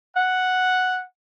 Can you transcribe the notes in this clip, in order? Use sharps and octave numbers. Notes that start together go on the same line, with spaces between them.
F#5